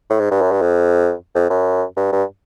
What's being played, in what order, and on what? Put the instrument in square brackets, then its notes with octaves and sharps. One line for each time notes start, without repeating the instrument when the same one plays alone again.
[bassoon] A2
G#2
G2
F#2
G2
F2
F2
F#2
G2
G2